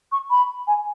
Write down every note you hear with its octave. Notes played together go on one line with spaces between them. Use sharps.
C#6
B5
G#5